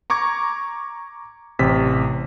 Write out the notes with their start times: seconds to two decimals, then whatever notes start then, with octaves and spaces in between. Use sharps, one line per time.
0.10 A#5 C#6 D6 G#6
1.59 A1 C3 B6